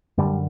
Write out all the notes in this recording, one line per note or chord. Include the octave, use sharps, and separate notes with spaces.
F#2 D3 G3